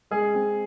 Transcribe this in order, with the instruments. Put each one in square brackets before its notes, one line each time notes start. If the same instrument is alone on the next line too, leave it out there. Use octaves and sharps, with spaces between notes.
[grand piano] G#3 [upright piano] G#4
[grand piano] C4